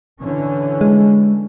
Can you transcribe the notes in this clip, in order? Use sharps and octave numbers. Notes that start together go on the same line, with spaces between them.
D3 E3 C#4
G#3